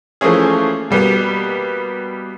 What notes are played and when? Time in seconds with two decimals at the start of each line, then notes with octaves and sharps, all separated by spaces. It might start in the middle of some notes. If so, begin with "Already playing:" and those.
0.21 E3 F3 A3 A#3 C#4 G#4
0.91 B2 G3 A#3 B3